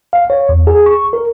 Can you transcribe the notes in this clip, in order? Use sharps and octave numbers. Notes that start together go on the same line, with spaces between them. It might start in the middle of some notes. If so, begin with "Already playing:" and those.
F5
C#5
E2
G#4
C#6
A#4